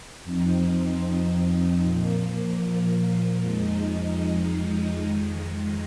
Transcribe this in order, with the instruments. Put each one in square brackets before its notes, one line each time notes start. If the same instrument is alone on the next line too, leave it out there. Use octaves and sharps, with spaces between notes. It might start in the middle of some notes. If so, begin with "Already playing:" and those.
[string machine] F2 F3 C4 D#4
A#2 F3 A#3
F2 F3 G#3 D#4
F2 D#3 G#3